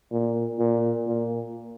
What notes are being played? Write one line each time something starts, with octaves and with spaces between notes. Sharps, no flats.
A#2
A#2
A#2